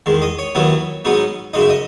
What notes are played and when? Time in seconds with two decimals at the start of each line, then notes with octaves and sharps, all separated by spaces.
0.06 E2 D#3 G#3
0.22 D#5
0.39 C#5
0.55 D#2 D#3 F#3 B3 E4
1.05 G#2 F#3 B3 D#4
1.53 F#2 C#3 G#3 D#4 D#5
1.61 E5
1.69 D#5